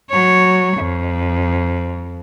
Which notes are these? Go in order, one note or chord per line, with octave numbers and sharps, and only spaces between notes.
F#3 C#5
F2